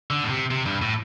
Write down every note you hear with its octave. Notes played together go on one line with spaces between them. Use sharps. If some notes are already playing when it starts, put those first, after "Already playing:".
D3
A2
C3
C3
G2
A2